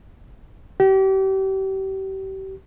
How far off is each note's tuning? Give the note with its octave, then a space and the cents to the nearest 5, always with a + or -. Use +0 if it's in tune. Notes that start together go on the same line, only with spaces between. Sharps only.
G4 -35